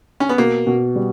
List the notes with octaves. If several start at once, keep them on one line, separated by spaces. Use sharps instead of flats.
C#4
B3
B2 A#3
B2
G3